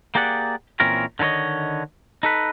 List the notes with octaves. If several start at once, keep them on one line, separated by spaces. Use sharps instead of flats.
A#3 G4 G#4 D5 F#5
A#2 E3 C4 C#4 A#4
D3 D#3 A4 C#5 D#5
D#4 A4 B4